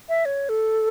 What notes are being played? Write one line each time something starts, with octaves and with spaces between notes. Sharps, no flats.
E5
C#5
A4